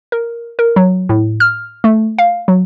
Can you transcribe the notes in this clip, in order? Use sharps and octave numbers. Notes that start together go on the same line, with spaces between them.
A#4
A#4
F#3
A2
F6
A3
F5
F#3